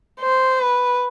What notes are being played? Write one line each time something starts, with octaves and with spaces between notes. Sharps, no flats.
C5
B4